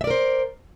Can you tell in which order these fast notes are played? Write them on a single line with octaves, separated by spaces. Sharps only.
E5 D5 A#4 C5